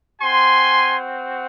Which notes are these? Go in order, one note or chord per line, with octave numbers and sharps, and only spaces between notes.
C4 F#4 G#5 C6